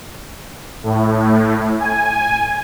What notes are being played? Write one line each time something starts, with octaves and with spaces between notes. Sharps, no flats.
A2
G#5